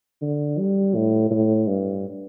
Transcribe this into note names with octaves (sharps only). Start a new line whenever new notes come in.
D3
G3
A2
A2
G2